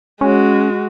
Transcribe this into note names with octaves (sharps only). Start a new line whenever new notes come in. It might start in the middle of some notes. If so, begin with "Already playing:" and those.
G#3 C#4 F#4